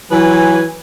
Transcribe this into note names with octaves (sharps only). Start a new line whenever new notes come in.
E3 F#3 B4 G#5